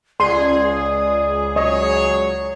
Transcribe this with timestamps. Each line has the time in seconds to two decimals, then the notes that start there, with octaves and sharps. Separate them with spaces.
0.20 C#2 G#4 D5 C6
1.56 F#3 G#3 C#5 D#5